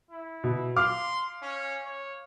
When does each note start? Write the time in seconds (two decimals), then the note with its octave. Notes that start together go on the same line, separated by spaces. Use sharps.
0.11 E4
0.44 B2
0.76 F5 C6 D6 F6
1.42 C#4
1.85 C#5